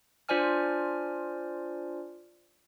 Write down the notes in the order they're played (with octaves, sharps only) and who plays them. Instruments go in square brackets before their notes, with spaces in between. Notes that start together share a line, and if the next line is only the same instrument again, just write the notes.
[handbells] D4 F4 C5 D5 G#5 F6